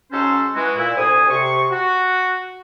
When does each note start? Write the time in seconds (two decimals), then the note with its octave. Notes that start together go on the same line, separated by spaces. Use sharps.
0.11 G#2 F#3 C#4 A4 C5
0.54 E3 G#3 F#4
0.76 A#2 E4
0.96 D2 C3 C5 G#5 D#6
1.29 C3 C#6
1.71 F#4